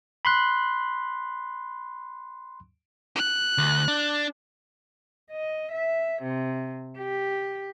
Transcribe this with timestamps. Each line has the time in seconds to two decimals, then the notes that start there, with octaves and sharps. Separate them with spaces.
0.25 B5 C6 F#6
3.16 F#6
3.58 D2
3.88 D4
5.31 D#5
5.72 E5
6.22 C3
6.98 G4